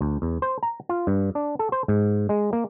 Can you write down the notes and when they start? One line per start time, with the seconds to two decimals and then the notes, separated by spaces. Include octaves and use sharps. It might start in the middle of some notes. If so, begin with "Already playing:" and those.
0.01 D2
0.22 E2
0.42 C5
0.63 A#5
0.89 F4
1.07 G2
1.35 D4
1.59 A4
1.72 C5
1.88 G#2
2.29 G#3
2.53 A#3